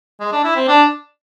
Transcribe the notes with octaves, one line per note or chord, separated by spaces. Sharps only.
G#3
D4
E4
C4
D4